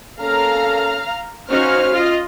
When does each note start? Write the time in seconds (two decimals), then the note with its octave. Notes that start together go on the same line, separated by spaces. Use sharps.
0.19 A#3 C#4 A4 F5 A#5 F6
1.50 C#4 D#4 F#4 C5 F5 F6
1.93 F4 D#5